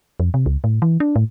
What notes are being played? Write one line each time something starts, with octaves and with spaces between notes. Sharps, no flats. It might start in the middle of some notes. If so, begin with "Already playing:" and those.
F2
C3
C#2
A2
E3
D4
A2